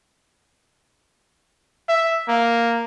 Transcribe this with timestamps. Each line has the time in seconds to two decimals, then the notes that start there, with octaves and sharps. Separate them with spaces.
1.89 E5
2.28 A#3